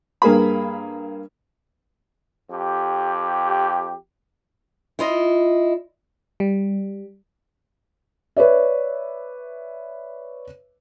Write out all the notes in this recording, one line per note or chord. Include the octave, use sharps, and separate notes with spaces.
G2 A#3 G#4 B5
F2 G4
E4 F4 D#5
G3
B4 C#5 D5 E5